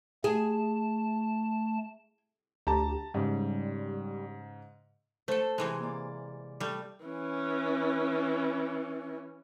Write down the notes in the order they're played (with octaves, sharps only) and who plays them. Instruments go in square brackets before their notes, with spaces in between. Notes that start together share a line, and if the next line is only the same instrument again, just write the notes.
[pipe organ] A3 A5 [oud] G#4
[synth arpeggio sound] D2 G4 [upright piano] A5 A#5
[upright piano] G#2 C#3 [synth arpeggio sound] G3
[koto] A3 A4 [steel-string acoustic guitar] C5 A5
[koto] C3 E3 G#3
[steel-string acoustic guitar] A#3 D5
[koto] G3 A3
[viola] E3 C#4